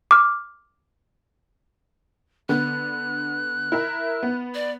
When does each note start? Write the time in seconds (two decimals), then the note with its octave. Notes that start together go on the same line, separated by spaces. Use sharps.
0.11 D6 F6
2.49 D3 B3 F#6
3.72 E4 A#4 E5
4.23 B3
4.55 D5